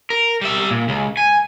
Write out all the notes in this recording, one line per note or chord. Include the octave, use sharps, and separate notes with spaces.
A#4
G3 E5
A#2
C#2
G#5